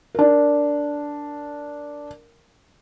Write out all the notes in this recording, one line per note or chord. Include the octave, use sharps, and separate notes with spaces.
D4 A#4